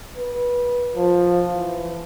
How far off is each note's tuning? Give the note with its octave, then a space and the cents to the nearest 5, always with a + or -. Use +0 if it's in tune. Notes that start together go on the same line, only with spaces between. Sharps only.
B4 -20
F3 +10
E3 +25